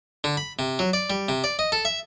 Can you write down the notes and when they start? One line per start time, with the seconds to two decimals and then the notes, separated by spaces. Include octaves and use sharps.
0.24 D3
0.37 B5
0.59 C3
0.79 F#3
0.93 D5
1.10 G3
1.29 C3
1.44 D5
1.59 D#5
1.72 A4
1.85 E5